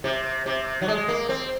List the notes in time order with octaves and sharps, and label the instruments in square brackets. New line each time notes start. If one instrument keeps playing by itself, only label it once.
[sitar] C3
C3
F#3
G#3
A#3
C4